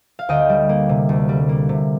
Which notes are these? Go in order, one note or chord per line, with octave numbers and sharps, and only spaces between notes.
F5
D2 D#5 G5
G3
A#3
C3
D2
G3
A#3
C3